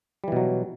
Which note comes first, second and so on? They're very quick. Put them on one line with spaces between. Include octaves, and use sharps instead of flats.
G3 E3 B2 F#3